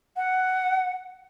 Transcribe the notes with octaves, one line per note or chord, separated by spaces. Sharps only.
F#5